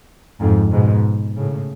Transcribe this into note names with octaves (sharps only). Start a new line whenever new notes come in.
F2 G#2
G#2 B2
A2 C#3